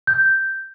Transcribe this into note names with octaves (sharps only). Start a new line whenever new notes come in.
G6